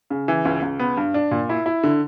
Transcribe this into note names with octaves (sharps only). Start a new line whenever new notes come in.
C#3
E3
C#2
C#2
B3
G2
D4
A#2
E4
E4
D3